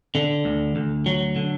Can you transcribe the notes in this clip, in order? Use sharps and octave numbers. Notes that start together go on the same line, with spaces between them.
D3
D2
D2
F#3
D3